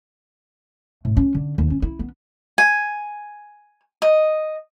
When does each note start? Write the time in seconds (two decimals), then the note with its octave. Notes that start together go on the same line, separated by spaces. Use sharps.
1.05 A2
1.17 C#4
1.35 D3
1.58 D#2
1.70 C#4
1.82 E4
1.99 B3
2.58 G#5
4.02 D#5